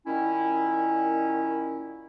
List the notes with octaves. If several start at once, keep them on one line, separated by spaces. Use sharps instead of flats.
A#2 D#3 C#4 E4